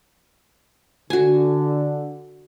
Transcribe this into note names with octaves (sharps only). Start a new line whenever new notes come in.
D3 F#4 G#5